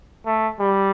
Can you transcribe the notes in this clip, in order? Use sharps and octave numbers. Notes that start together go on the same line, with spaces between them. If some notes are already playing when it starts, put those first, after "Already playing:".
A3
G3